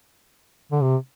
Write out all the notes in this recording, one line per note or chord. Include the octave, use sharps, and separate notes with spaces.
D3
C3